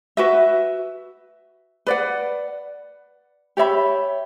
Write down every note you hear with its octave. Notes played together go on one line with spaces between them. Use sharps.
F#4 B4 E5
B4 D5 F#5
G4 C#5 E5 B5